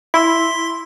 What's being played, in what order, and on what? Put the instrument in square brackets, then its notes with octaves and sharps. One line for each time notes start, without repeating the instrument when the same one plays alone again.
[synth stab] E4 [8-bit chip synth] C6 B6